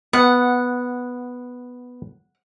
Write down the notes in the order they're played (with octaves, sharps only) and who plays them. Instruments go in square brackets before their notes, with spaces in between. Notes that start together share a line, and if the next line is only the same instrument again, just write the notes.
[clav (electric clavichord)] B3 [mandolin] F#5